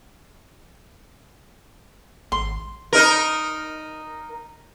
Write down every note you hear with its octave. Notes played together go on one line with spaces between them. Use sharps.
G#1 C6
D#4 A#4